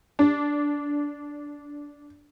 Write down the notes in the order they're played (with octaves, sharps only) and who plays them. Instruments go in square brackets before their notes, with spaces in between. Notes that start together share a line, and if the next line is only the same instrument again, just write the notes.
[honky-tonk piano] D4